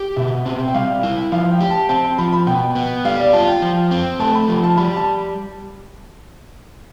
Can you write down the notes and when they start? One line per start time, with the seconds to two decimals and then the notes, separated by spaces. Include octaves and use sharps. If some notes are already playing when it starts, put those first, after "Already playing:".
Already playing: G4
0.16 B2 E5
0.46 C4
0.68 G5
0.74 G3 F5
1.03 E4
1.32 F3 F5
1.51 G5
1.60 G4
1.70 A5
1.89 C4 A5
2.05 A5
2.18 F3 B5
2.33 B5
2.47 B2 G5
2.75 B3
3.05 G3 F5
3.20 D5
3.33 F4 A5
3.47 G5
3.62 F3
3.91 C4
4.20 A3 A5
4.35 B5
4.48 F3
4.63 A5
4.77 G3 B5
4.96 A5